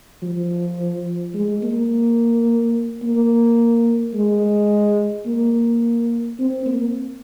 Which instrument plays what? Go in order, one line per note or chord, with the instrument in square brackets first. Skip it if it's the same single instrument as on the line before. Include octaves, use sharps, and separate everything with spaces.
[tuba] F3
G#3
A#3
A#3
G#3
A#3
C4
A#3